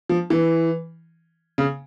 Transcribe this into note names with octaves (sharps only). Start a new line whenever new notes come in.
F3
E3
C#3